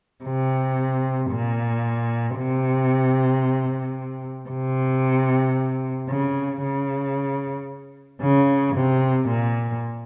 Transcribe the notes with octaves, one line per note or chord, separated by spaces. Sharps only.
C3
A#2
C3
C3
C#3
C#3
C#3
C3
A#2